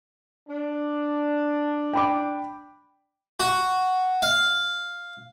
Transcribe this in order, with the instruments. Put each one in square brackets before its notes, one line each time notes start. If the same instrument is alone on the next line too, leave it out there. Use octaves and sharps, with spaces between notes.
[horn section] D4
[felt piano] G5 B5 D6
[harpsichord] F#4
F5